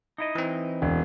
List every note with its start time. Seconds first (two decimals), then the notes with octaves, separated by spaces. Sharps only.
0.18 D#4 E4 D#5
0.35 E3 C4
0.82 E1